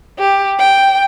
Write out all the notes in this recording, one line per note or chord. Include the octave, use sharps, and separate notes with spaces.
G4
G5